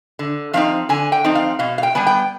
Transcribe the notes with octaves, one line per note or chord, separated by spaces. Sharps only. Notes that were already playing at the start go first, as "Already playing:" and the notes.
D3
F3 C4 D#4 F5
D3 G#5
G5
F3 C4 D#4
F5
B2 F5
F5
G5
G3 B3 G#5
G5